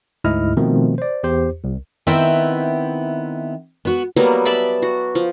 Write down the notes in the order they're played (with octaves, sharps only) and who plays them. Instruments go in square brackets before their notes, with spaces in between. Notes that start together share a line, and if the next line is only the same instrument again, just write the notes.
[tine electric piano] D2 G#2 E4 D#5 F6
B2 D#3 F3 A3 C4
C5 D5
E2 G4 C5
C2
[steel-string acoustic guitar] D#3 B3 C4 E4 E5 G5
B3 F#4
[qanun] F#3 G3 A#3 B3
D5 E5 A5 B5
F#4
F3